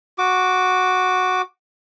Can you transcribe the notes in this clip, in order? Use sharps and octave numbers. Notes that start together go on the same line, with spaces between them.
F#4 D6